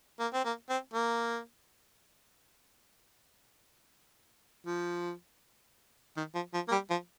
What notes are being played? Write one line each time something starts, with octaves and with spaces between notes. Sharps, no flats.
A#3
C4
A#3
C4
A#3
F3
D#3
F3
F3
A#3
G3
F3